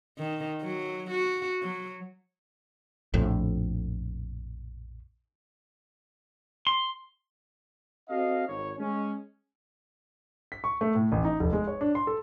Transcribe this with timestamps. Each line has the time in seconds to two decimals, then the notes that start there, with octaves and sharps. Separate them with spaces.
0.18 D#3
0.62 F#3
1.11 F#4
1.62 F#3
3.14 A#1 F2 A2
6.67 C6
8.09 C4 F#4 A4 D#5 F5
8.47 G#1 D#4 C#5
8.78 G#3 C#4
10.52 B6
10.64 C#6
10.81 A3
10.95 A2
11.12 A1
11.25 D#4
11.40 F1
11.53 G#3
11.68 C#5
11.81 D4
11.95 C6
12.07 A4